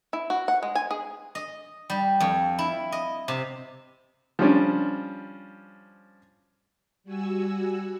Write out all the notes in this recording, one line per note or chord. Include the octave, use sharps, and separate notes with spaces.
E4
F#4
F#5
G#3
G#5
G#4
D#5
G3
F2
E4
D#5
C3
F3 G3 C#4 D4
G3 F#4 G#5 E6